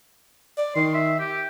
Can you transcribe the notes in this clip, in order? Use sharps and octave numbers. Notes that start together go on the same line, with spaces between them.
D5
D#3 C6
E5
G4